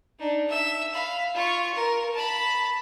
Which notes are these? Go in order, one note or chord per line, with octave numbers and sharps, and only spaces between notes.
D4 D#4
E5 E6
F5 B5
F4 C#6
A#4
A5 B5